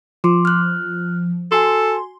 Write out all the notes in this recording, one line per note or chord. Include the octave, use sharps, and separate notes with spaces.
F3 C6 D6
F6 F#6
F#4 A4 G#5 C6